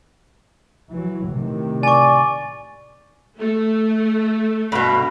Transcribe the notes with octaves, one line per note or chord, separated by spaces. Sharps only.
E3 F#3
A2 C3 D#3
D5 G#5 C#6
A3
G2 B2